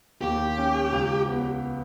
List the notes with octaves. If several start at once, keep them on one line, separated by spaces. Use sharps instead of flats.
D#2 G4
C#4
C#2
B3